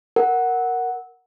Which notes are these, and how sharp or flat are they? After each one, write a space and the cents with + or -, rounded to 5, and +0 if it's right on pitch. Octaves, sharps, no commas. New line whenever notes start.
A#4 +0 F#5 +0